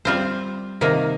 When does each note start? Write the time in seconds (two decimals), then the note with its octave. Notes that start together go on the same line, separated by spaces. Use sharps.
0.05 G3 C4 F4 C5
0.81 C3 D#3 A#3